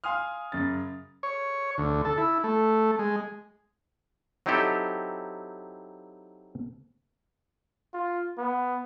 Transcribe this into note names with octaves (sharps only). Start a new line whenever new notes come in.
F5 G#5 C6 D#6 F6
F#2 C#3 A6
C#5
D2
A4
E4
A3
G#3
F#3 C4 D#4 E4 G4 A4
F4
B3